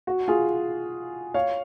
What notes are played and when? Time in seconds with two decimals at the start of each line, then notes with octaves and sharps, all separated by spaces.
0.07 F#4
0.28 F4 G#4
1.34 C#5 F5